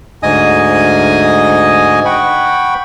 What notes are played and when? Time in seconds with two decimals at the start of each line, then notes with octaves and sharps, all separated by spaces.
0.23 D2 G#2 D#5 G#5 D#6
2.05 F#5 G5 B5 C#6